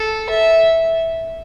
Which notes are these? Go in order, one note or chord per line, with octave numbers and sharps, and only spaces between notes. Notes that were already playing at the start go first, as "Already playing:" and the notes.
Already playing: A4
E5